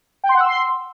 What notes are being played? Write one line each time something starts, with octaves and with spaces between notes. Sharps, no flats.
G5
C6
F#5
E6
C6